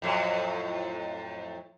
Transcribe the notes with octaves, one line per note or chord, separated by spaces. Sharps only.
F2 A2 F#3